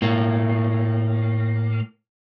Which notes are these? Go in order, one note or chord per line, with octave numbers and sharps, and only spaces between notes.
A2 A#3